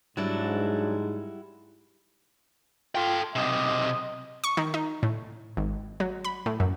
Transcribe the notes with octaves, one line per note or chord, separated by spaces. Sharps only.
G#2 F#3 G3 D4 E4 F#4
F4 A4 G5
B1 C3 D#5
C#6
D#3
D#4
A2
G#1
F#3
B5
A2
F#2